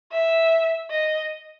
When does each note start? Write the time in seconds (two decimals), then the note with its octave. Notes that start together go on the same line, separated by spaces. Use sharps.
0.12 E5
0.91 D#5